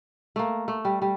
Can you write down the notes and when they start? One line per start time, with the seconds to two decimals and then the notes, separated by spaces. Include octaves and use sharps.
0.36 A3 A#3
0.68 A3
0.85 G3
1.02 G3